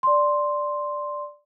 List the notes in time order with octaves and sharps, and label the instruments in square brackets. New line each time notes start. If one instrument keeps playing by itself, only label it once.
[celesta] D5 C6